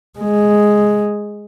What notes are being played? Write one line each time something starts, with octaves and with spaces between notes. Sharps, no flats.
G#3